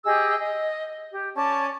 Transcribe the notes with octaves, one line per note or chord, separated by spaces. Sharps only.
G4 G#4 D#5 E6
D#5
G4
C#4 D5 A5